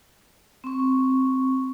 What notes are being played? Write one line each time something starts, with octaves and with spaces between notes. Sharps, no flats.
C4 C#6